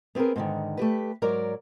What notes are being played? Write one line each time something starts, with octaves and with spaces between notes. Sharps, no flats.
B3 C4 F#4 G#4 A#4
G#2 B2 D3 D#3
A3 G4 B4
G#2 F#3 A#4 C#5 D5 A#5